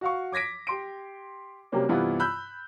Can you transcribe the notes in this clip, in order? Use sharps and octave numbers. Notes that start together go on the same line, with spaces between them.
F#4 F5 C#6
D6 G#6 A#6 B6 D7
G4 C6 D7
C3 F#3 G3 A#3 C#4
G2 C3 E3 B3 E4 F4
B5 E6 F#6 G6